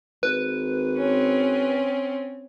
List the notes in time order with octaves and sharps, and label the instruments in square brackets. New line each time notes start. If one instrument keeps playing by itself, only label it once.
[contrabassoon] G#1 [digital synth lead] B4
[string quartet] C4 C#4